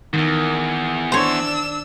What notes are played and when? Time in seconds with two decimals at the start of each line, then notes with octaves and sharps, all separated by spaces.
0.13 E2 G#2 D#3
1.12 D4 C5 C#5 E6